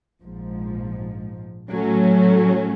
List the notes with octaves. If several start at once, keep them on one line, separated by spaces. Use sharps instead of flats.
A#1 G#2 F3
A2 F#3 A3 C#4